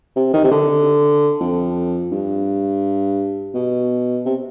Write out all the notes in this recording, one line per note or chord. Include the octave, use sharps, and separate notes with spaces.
C3
D#3
C3
D3
F2
G2
B2
C3